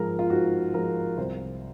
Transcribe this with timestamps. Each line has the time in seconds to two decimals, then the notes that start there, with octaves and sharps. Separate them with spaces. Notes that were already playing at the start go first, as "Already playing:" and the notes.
Already playing: G#2 F3 G#3 A#4
0.19 F4
0.30 G#2 F#4
0.74 F3 G#3 A#4
1.18 C2 C5